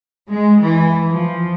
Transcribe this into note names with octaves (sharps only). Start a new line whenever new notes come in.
G#3
E3
F3